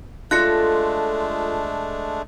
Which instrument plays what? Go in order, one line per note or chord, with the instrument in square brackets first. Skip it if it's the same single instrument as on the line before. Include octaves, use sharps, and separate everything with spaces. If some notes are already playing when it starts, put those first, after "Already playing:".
[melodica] G#3 A3 D4 [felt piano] F4 [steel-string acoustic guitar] A4 [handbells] F#6 A#6 C#7